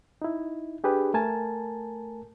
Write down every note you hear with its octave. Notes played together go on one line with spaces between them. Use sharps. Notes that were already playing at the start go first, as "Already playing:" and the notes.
D#4 E4
D4 G4 G#4 B4
A3 A#4 G#5 A5